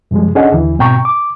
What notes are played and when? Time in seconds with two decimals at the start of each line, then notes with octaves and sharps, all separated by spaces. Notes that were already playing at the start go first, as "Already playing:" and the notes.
0.11 F#2 C3 F3 G3 G#3
0.35 C#4 D4 G#4 A4 D#5 F#5
0.52 D#2 D3 E3
0.79 G#2 B2 C4 G5 A#5 C#6
1.05 D6